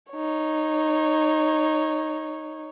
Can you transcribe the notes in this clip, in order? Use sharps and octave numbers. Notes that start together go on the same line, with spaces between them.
D#4 C#5